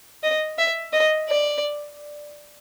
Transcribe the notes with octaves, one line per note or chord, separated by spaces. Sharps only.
D#5
E5
D#5
D5